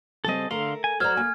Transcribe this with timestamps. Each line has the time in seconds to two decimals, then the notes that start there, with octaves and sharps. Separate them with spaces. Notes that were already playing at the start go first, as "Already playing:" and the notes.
0.25 C#3 G3 C4 A4 D#5
0.51 D3 A3 A#4 F5 C6
0.84 G#5
1.00 F#3 F#4 C5 D5 A#5 F6 G#6
1.17 A#3 G#5